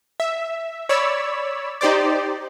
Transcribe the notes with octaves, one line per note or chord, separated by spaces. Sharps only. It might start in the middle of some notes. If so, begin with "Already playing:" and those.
E5
C#5 D5 B5 E6
D#4 G4 C5 D5